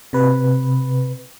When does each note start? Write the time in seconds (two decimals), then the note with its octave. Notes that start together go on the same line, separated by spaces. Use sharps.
0.13 C3 B4